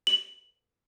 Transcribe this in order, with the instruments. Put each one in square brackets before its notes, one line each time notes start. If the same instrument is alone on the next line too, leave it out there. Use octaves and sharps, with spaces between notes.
[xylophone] F#7